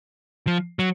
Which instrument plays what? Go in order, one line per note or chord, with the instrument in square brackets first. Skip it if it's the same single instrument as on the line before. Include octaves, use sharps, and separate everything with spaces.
[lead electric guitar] F3
F#3